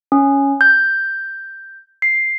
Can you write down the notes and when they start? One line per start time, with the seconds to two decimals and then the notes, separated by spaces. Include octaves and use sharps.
0.12 C#4
0.61 G6
2.02 C7